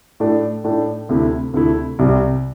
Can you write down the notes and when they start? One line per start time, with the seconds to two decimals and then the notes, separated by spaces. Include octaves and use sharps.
0.20 A2 A3 D4
0.64 A2 A3 D4
1.09 D2 C3 A3 E4
1.54 D2 C3 A3 E4
1.99 C2 C3 G3